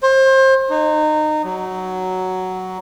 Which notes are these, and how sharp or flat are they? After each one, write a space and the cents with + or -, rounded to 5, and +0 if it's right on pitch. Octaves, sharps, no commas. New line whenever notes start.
C5 +30
D#4 -25
F#3 +5